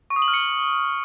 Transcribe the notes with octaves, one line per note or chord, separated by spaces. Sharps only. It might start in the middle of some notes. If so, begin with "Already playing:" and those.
C#6
D#6
F#7
F6
C#7